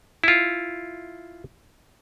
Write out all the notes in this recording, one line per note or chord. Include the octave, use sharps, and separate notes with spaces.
E4 F4